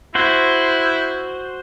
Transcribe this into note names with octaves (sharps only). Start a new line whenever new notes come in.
E4 F#4 C5